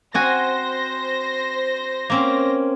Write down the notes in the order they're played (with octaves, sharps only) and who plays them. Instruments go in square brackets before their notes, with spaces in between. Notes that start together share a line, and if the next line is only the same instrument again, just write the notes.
[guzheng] C4 F#4 G#5 [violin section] C5 A#6
[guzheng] A#3 C4 C#4